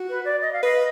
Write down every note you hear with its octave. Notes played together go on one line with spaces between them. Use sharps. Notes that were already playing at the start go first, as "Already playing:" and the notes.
Already playing: F#4
B4
D5
D#5
F5
B4 D#5